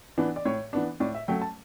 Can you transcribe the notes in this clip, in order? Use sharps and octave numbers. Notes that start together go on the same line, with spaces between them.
E3 B3 D4
D5
A2 C#5
E3 B3 D4
A2 D5
E5
F#3 A3 C#4 G5
A5